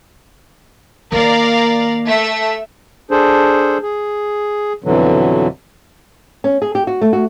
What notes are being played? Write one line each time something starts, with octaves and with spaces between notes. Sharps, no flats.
D#3 A#3 A#4 D5 F5
A3 E5
D4 G#4 A4 C5
G#4
F2 B2 D3 E3 F#3
C#4
G#4
G4
F#4
A3
F#4